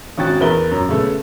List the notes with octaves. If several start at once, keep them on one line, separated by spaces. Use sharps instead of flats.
G#1 C#4 F#4 G5 A6
E2 A#4 B4 E5 G7
F#2
C#3 A3 B3